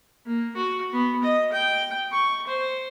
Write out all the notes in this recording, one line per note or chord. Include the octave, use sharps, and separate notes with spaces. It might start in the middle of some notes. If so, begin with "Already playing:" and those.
A#3
F#4
B3
D#5
G5
C#6
C5